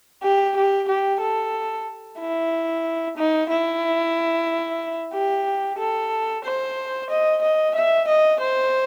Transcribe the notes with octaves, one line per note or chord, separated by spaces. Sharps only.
G4
G4
G4
A4
E4
D#4
E4
G4
A4
C5
D#5
D#5
E5
D#5
C5